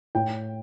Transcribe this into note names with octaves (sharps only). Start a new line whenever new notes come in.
A2 G5